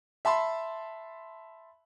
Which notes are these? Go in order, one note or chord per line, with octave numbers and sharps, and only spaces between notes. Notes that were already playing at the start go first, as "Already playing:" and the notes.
E5 A5 B5 C6